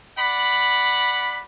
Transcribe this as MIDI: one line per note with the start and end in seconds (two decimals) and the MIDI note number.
0.18 1.41 74
0.18 1.41 78
0.18 1.41 83